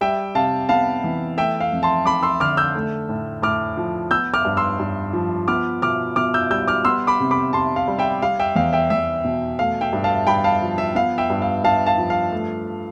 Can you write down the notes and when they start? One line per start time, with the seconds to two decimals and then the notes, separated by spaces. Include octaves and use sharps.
0.01 G3 E5 G5
0.35 C3 F5 A5
0.69 B3 F5 A5
1.04 E3
1.37 A3 E5 G5
1.60 F5
1.72 F2
1.83 A5 C6
2.05 F2 B5 D6
2.23 C6 E6
2.40 D3 D6 F6
2.57 E6 G6
2.75 A3
3.09 A2
3.42 A2 D6 F6
3.77 F3
4.11 B3 E6 G6
4.34 D6 F6
4.45 G2
4.57 C6 E6
4.79 G2
5.13 F3
5.48 B3 D6 F6
5.82 B2 D6 F6
6.16 B2 D6 F6
6.34 E6 G6
6.50 G3 E6 G6
6.68 D6 F6
6.85 B3 C6 E6
7.07 B5 D6
7.20 C3
7.31 B5 D6
7.53 C3 A5 C6
7.76 F5
7.88 G3
7.99 E5 G5
8.22 G3 F5
8.39 E5 G5
8.56 E2 F5
8.73 E5 G5
8.90 E2 E5
9.24 B2
9.59 A3 F5
9.81 E5 G5
9.93 G2
10.04 F5 A5
10.27 G2 G5 B5
10.44 F5 A5
10.62 F3
10.78 E5
10.95 B3 F5
11.18 E5 G5
11.30 G2
11.42 F5
11.64 G2 F5 A5
11.86 F5 A5
11.98 F3
12.10 F5
12.32 A3